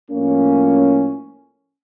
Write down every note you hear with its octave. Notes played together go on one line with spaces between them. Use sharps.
A2 F3 A#3 C#4